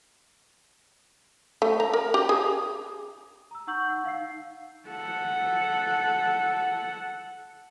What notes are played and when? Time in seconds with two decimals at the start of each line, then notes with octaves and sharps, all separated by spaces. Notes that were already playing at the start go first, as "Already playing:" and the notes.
1.62 A3
1.80 A#5
1.94 A#4
2.14 G4
2.29 G#4
3.51 A#5 E6
3.67 D#4 F#5 C#6 E6 G6 F#7
3.89 F#5 E6
4.04 D#4 F5 E6 C7
4.88 A4 F#5